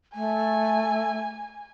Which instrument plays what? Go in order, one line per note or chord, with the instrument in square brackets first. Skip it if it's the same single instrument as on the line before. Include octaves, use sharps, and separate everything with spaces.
[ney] A3 [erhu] G#5